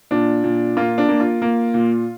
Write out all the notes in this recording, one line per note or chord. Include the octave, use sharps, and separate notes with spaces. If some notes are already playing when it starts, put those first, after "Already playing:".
A#2 D4
A#2
A#3 F4
D4
A#3
F4
A#3
A#2